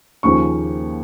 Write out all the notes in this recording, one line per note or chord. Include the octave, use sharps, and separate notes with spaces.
D#2 C#3 F3 A#3 C#4 C#6